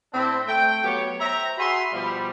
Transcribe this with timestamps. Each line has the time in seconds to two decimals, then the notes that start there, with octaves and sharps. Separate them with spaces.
0.13 A2 C4 D4 E4
0.47 A3 G5
0.83 F#3 B3 G4 C#5
1.20 C5 E5 G5 A#5
1.58 F#4 G#4 E5 B5 C6
1.92 B2 F3 G3